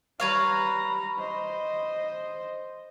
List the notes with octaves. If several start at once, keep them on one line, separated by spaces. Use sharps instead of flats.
G3 B4 C#5 F5 A#5
C5 D#5